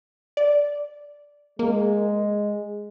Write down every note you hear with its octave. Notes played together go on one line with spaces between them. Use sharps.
D5
G#3 A#3